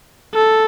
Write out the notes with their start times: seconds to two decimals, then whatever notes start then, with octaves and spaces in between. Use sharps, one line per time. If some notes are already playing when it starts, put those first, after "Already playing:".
0.35 A4